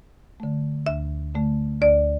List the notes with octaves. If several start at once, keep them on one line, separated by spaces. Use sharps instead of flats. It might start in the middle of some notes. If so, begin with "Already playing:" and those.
D3 A3
D2 E5
D3 A3
D2 D5